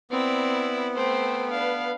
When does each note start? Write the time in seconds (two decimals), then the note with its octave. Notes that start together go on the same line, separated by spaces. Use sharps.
0.11 B3 C4 E4 D5
0.95 A3 C4 C5
1.51 D4 B4 F5